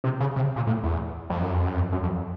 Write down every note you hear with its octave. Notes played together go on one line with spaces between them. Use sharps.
C3
C#3
C3
A#2
A2
E2
F2
F#2
F2
F#2
F2
F#2
F2